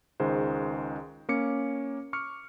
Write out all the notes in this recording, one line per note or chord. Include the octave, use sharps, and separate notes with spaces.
C#2 D#3 G#3 C5
A#3 C#4 D6 C#7
C#6 D6 F6 C#7